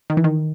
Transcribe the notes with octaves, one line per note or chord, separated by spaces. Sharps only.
D#3
E3
D#3